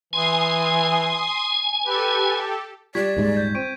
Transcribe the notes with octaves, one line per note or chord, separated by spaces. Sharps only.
E3 G#5 C6 D#6
G4 A4 B4
G3 D5 C#6 G#6 B6
D#1 G#2 G#3
G6
C4 C#6 D7 D#7